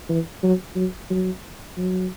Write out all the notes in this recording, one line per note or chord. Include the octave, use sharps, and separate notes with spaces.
E3
F#3
F#3
F#3
F#3